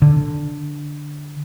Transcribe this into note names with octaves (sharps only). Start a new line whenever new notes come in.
D3